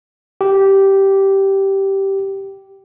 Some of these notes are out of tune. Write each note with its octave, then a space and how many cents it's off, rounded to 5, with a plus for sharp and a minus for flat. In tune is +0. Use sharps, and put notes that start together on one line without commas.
G4 -10